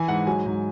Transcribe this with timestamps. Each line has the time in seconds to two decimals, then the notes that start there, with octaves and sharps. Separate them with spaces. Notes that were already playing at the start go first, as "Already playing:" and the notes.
Already playing: E3 G#5
0.08 G#2 F#5
0.27 F#3 G#5
0.46 G#2